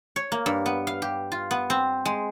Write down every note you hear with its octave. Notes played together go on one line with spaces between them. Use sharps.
C#5
A#3
G2
B3
F5
G4
F4
B3
C4
G#3